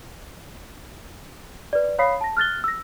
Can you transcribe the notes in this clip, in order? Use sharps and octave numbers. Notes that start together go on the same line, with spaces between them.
B4 D5
C#5 F5 B5 D#6 B6 C7
A5 A#6
F6 F#6 A6 G7
E6 A#6